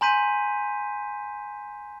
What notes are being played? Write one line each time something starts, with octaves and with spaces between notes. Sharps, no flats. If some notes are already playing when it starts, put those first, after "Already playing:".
G#5 A#5 C6 G6 B6 D#7